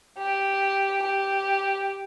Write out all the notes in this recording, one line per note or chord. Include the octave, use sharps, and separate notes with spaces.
G4
G4